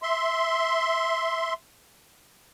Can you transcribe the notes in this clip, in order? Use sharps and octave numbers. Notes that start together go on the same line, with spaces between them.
E5 C6